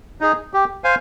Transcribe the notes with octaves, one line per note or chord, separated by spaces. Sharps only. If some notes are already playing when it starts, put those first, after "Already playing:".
D#4 G#4
G4
C5 F5 G#5